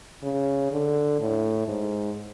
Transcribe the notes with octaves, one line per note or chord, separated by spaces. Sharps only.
C#3
D3
A2
G#2